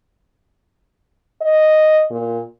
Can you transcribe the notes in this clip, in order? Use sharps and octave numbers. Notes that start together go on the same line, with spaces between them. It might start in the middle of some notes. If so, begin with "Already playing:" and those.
D#5
A#2